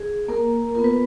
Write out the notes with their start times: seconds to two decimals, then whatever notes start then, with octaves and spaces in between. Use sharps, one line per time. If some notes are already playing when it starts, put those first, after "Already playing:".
Already playing: G#4
0.28 A#3 A#4
0.75 B3 F4 A#4
0.84 B4